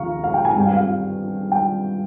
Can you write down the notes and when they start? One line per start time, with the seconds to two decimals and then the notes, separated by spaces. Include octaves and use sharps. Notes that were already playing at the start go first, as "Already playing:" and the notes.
Already playing: D#2 C#3 F3 F5 A#5 C#6
0.24 F5
0.34 G5
0.45 G#5
0.56 G2 G3 C4 G5
0.66 F5
0.77 F5
1.52 G5